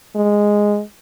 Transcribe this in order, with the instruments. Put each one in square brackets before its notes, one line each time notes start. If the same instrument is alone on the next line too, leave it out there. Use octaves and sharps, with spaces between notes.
[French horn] G#3